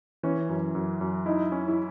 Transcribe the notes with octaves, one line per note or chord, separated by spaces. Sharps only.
E3 C#4
F#2
F#2
F#2
D#4 E4
C#4
E4